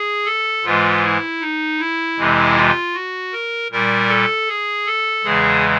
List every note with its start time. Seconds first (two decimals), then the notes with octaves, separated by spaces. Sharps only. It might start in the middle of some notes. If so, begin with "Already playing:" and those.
Already playing: G#4
0.25 A4
0.64 G#2 E3 G#3 F4
1.03 E4
1.41 D#4
1.79 E4
2.17 F2 C3 E3 G#3
2.55 F4
2.94 F#4
3.32 A#4
3.71 A#2 G3 A#4
4.09 A4
4.48 G#4
4.86 A4
5.24 E2 C#3 E3 G#3 G#4